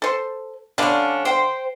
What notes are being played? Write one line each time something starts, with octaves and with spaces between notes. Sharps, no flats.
A4 C5
D3 G3 C#4 D4 F5
C5 G5